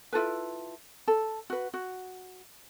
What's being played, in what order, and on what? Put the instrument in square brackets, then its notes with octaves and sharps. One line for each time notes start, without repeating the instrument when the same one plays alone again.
[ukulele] E4 F4 A4 B4
A4
F#4 B4
F#4